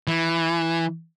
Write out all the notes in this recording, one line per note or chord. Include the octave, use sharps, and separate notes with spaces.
E3